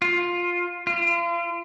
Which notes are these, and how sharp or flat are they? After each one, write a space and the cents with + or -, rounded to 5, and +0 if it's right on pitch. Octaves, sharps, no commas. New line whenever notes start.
F4 +10
F4 -35